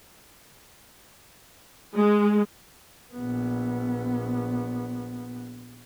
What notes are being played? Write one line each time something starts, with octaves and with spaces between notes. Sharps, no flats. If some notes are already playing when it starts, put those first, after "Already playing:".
G#3
A#1 B3